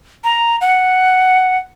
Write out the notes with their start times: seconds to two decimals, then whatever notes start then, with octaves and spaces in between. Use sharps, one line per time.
0.24 A#5
0.61 F#5